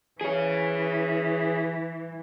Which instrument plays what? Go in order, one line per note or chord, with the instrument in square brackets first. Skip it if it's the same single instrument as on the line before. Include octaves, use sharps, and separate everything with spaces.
[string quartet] E3 [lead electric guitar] G#4 C#5